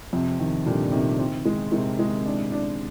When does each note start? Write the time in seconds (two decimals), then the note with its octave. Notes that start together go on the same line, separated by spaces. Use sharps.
0.13 F2 C3
0.40 D#3
0.66 A#2 D3 G3
0.92 C3 D#3
1.19 C4
1.45 G#3
1.72 C3 D#3 G#3
1.99 G#3
2.26 D4
2.52 D4